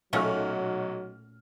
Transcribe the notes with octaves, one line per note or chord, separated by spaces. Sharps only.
B1 A#2 F#3 A3 C#4 F#4 F6